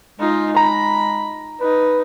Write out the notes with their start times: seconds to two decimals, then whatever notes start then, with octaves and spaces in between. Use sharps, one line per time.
0.20 G#3 D#4 F4
0.56 A#5 B5
1.61 D#4 B4